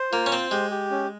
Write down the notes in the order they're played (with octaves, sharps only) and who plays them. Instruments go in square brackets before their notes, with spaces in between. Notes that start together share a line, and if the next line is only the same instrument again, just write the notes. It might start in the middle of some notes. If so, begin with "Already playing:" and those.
Already playing: [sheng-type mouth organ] C5
[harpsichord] A#3 [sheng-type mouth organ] F4
[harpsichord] C#4
[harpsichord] C4 [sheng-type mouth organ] C5
[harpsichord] G#3 [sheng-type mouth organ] G4
[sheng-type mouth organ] G4
C#4